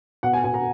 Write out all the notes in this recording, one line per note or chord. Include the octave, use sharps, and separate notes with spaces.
B2 F#5
G#5
B2 G#5
A#5